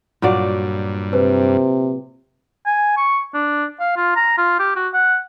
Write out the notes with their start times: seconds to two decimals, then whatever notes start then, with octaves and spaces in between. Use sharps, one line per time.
0.22 G2 A#2 F#3 D5
1.13 C3 B4 C5
2.66 G#5
2.97 C#6
3.34 D4
3.80 F5
3.96 F4
4.16 A#5
4.38 F4
4.59 G4
4.76 F#4
4.94 F#5